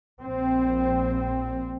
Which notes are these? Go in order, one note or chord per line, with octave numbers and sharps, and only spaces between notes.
A#1 C4